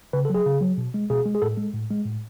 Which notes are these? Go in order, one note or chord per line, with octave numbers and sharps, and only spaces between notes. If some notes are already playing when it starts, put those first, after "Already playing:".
C#3 B4
A4
F#3 G#4
C#3
F#3
B2
G#3
B2 G#4
G#3
G#4
A2 A4
G#3
A2
G#3
A2